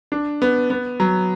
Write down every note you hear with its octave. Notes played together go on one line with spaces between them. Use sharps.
D4
B3
B3
F#3